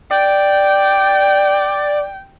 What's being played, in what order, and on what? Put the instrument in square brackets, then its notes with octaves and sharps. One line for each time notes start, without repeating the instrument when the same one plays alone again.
[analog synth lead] D5 [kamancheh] G5